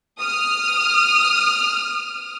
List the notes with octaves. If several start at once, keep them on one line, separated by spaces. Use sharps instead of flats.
D#6 F6